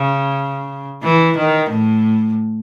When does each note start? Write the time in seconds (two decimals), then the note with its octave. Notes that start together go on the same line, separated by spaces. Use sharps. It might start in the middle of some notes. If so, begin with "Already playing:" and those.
Already playing: C#3
1.03 E3
1.37 D#3
1.71 A2